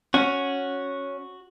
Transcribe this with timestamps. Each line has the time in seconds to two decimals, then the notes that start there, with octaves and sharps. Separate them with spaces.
0.14 C#4 F#4